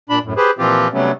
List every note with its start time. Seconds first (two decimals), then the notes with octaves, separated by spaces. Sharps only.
0.10 A#2 D4 B5
0.24 F#2 A2
0.37 G4 G#4 B4 C5
0.59 A#2 E3 F3 C4 F4 G4
0.93 C3 F#3 G3 A3 B3 C#4